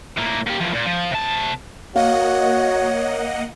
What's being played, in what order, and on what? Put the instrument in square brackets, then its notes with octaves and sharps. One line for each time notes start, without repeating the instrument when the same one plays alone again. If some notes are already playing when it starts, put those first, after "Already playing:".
[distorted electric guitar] A2 A#3
A#2 G4
E2 F3
A#2
F3
C3 A5
[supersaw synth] A#3 D#5 F#5 [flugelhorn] F#4 [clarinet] C#5 [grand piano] F5